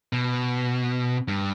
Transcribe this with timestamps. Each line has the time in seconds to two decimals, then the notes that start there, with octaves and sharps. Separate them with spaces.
0.13 B2
1.28 G2